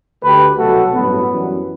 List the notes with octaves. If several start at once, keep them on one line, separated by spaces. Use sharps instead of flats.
D2 D3 A3 G4 B4
C2 B2 F#3 A3 F#4 A4
A1 G2 F#3 B3
F#2 E3 G3